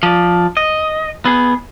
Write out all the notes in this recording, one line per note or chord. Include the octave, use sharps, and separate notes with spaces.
F3 D5
D#5
B3 G#4